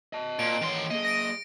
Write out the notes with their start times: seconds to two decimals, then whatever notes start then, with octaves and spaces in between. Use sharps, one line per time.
0.13 D#5 A5
0.39 A#2 D7
0.61 D#3 E3 C#5 C6
0.91 A#3 G#4 D#5
1.05 A#6 D7